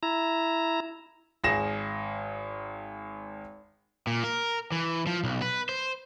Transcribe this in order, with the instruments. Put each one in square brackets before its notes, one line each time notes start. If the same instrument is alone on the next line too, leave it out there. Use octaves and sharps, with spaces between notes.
[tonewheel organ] E4 A#5
[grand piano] G#1 G#4 A#6 E7
[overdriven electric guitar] A#2
A#4
E3
F3
B1
B4
C5